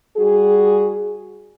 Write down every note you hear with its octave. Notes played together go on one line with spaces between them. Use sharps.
G3 F#4 G#4